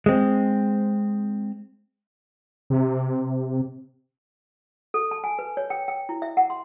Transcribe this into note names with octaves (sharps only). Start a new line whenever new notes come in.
G#3 C4
C3
A4
A5
G#5
B4
C#5
G5
G5
E4
E5
F#5
C6